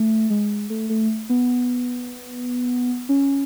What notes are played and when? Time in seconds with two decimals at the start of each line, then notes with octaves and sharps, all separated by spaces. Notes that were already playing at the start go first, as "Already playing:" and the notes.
Already playing: A3
0.30 G#3
0.70 A3
0.89 A3
1.29 B3
3.09 C#4